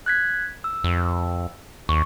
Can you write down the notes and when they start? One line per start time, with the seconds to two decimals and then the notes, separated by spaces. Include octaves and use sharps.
0.06 F#6 G#6 B6
0.64 E6
0.84 F2
1.89 D#2 C#6